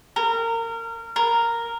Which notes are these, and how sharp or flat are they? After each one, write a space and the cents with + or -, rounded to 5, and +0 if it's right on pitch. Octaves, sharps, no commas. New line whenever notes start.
A#4 -25
A#4 -5